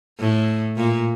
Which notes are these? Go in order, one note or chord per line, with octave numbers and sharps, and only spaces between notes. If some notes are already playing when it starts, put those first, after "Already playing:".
A2
A#2